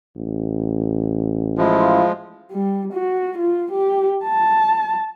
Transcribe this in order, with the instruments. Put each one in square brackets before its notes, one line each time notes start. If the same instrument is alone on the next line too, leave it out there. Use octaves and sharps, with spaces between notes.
[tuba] A1
[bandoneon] F3 G#3 [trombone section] E4 F4
[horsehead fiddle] G3
F#4
F4
G4
A5